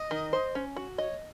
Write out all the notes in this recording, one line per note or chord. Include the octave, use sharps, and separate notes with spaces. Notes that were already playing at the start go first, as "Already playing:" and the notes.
Already playing: D#5
D#3
C5
C#4
F#4
C#5 D#5